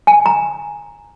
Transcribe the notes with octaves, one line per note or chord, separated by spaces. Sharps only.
G#5
A#5